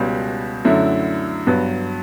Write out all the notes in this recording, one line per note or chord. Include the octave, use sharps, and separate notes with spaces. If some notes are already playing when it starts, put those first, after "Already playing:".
Already playing: C#2 B2 G3 C#4
F#2 D3 F#3 A3 E4
G2 F#3 B3